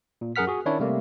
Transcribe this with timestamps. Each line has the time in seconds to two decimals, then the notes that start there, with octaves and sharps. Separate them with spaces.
0.21 A#2
0.36 F#2 G#4 A#4 F#5 F6 B6
0.47 F#4 G#4
0.66 D#3 C#4 D4 E4 C#5
0.80 C3 G3 A3 A#3